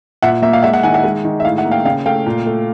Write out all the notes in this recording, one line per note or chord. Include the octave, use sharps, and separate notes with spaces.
A#2 E5 F#5
A#3 E5
F5
G#3 E5 F#5
E5 F#5
D#3 F#5 G#5
E5 F#5
G#3
D#3
E5
A2 F5
E5 F#5
A#3
F5 G5
C#3 F5 G5
A3 F5 G5
A#2
A3